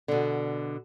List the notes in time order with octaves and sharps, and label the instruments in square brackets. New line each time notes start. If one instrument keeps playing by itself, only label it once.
[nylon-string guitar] B2 D3